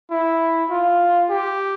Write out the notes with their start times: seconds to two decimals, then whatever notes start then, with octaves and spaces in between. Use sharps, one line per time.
0.11 E4
0.70 F4
1.30 G4